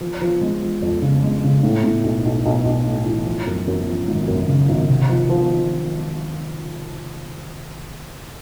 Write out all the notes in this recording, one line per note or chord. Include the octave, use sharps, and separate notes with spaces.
F3
F3
G#3
F3
F2
C#3
G#3
C#3
A2
A2
B1
B1
B1
B1
A2
E3
F3
F#2
F#2
F3
G#1
F#2
C#3
G#1
C3
F3
F3
F3